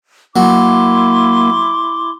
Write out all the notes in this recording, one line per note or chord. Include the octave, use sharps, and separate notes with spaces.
F#3 A#3 E4 C6 D6